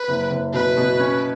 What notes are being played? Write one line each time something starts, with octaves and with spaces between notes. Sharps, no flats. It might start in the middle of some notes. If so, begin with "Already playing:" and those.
Already playing: B4
F#1
F#1
B2 B4
B2
C#4